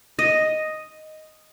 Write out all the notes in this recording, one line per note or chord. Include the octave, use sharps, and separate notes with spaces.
D#5